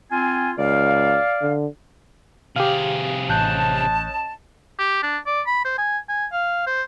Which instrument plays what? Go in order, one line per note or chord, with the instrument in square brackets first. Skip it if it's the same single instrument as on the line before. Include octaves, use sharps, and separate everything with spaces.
[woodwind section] C4 F4 G#5
[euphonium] C#2 [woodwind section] D5 F5
[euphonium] D3
[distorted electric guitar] C3 G#4 [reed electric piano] G4 F5
[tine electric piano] A1 F#6 G6 [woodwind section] C#4 D#5 A5
[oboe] G4
D4
D5
B5
C5
G#5
G#5
F5
C5